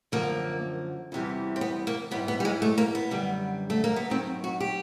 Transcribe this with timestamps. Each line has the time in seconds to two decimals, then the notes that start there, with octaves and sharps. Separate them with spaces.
0.12 F#2 D3 F3 A#3
1.12 E2 C3 E3 G3
1.56 C4
1.61 B3
1.87 A#3
2.11 G#2 E3 G3 B3
2.28 B3
2.40 G3
2.45 G#3
2.62 A3
2.78 A#3
2.95 B3
3.11 F#2 D3 G3
3.70 A3
3.84 A#3
3.96 B3
4.10 G#2 D#3 F#3 C4
4.44 F#4
4.60 G4